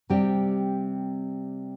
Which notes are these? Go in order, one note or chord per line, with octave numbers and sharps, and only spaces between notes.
C3 G3 C4 G4